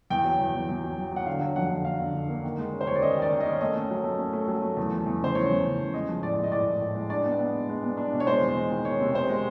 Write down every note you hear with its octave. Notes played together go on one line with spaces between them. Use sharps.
E2 G5
F#3
E2
E2
E2
F#3
F#3
F#3 F#5
D3 F5
F#3
F2 F#5
D3
D3 F5
D3
D3
A#3
D#3
G#3
C#4
C5
D#2 C#5
D5
C#4 D#5
D#3
D5
D#3
D#5
C#4
A3 D#5
C#4
F#3
A3
C#4
A3
F#3
A3
E2
F3
E2
C#3 C5
E2 C#5
E2
C#3
E2
G#3 D#5
F3
A2 D5
G#3
D#5
A2 D5
A2
A2
G#3
D4 D5
B3
B3
G#3
G#3
B3
D4
B2
C#5
G#3 C5
E2
G#3
D#3
G#3 C#5
C3
C3 C5
G#3